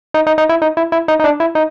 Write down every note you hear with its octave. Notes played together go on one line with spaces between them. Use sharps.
D#4
D#4
D#4
E4
D#4
E4
E4
D#4
D#4
D4
E4
D#4